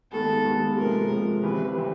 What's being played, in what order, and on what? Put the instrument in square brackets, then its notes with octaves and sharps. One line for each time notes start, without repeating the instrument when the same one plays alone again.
[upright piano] G2 D#3 G#3 B3 [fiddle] A4
[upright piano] G2 D#3 G#3 B3
[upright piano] C3 F3 G#3 [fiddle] A#4
[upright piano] C3 F3 G#3
[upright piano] G2 E3 G3 C4 [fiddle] B4
[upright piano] E3 G3 C4